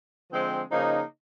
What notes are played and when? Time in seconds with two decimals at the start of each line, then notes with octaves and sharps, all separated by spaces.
0.30 D3 F3 G#3 C4
0.70 C#3 F3 A#3 D#4